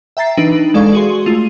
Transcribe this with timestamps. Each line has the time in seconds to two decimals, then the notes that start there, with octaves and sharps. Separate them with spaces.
0.17 E5 G5 A#5 A6 C7
0.37 E3 D4 D#4 B4 D7 F#7
0.74 G#3 A4 D5 F5 C#6
0.93 F#4 G#4 C6
1.26 A3 F4 D#7